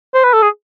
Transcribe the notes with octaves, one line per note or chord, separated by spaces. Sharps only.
C5
B4
A4
G#4